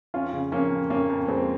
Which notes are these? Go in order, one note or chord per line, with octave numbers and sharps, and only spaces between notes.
F2 C#4 F4
C#3
F3 A#3 C#4
F2
F2 A#3 C#4
F2
F2 G#3 C4